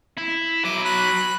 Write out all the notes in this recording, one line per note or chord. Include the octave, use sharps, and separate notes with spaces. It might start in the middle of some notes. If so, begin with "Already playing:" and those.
E4
F#3 B4 D6
B5 F#6